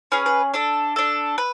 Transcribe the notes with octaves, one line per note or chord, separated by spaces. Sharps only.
C#4 G#4 B4
B4
D4 A4
D4 A4
B4